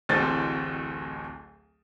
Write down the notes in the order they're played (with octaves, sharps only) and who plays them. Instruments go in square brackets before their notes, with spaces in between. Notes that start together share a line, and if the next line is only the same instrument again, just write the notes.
[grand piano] D1 A1 D2 C4 A6